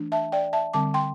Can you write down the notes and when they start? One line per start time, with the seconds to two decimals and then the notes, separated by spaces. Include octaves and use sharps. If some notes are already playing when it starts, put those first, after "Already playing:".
Already playing: E3 A3 D4
0.12 E5 A5
0.32 D5 G5
0.53 E5 A5
0.74 D3 G3 C4 A5 D6
0.94 G5 C6